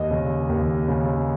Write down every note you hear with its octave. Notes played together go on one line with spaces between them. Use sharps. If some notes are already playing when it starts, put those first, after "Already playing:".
Already playing: D#2 D#5
C#3
D#2
C#3